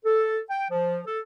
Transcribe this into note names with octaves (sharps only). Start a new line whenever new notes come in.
A4
G5
F3
A4